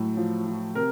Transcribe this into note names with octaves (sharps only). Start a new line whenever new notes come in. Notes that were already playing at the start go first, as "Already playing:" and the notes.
Already playing: A2 F#3
F3
F3
C3 A#4